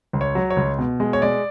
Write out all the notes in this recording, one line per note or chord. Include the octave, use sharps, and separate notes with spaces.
C#2
C#5
F#3
C#5
C#2
B2
G#3
C#5
G#3 D5